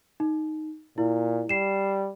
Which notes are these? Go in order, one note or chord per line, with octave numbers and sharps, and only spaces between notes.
D#4
A#2 E4
G3 C7 E7